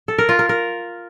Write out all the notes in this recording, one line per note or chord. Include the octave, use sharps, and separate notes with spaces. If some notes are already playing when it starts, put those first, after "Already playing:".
A4
A#4
F4
A#4
A#4